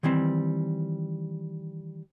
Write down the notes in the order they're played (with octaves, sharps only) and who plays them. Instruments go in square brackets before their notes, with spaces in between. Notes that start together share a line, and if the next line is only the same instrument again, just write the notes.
[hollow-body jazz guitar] D#3 E3 G3 C4